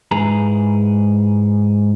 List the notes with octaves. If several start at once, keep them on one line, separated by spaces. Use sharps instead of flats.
G#2 E4 G#4 B4 A#5